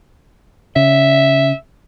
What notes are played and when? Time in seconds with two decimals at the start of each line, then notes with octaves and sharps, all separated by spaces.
0.76 C#3 E5